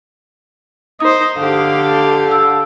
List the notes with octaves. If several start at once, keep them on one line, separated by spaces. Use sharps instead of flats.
D#4 C5 D#6
D3 G4 F5
E6